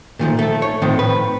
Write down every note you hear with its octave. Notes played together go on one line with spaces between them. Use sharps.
A#2 D#3 F3 A3
A3 A4
C#5
A2 D#3 F3 C4
B4